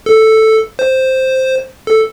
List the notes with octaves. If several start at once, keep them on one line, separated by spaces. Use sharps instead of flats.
A4
C5
A4